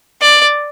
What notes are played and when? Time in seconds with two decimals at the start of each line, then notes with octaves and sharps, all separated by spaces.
0.21 D5